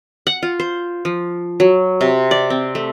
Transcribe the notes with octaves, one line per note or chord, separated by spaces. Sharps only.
F#5
F4
C5
F3
F#3
C3
D5
C4
A3